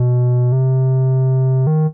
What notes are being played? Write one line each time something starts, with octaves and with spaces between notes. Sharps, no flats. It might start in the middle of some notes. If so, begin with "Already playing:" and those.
Already playing: B2
C3
D#3